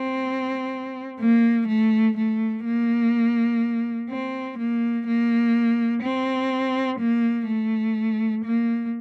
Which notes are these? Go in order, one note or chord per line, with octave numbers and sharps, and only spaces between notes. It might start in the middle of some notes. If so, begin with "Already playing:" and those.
Already playing: C4
A#3
A3
A3
A#3
C4
A#3
A#3
C4
A#3
A3
A#3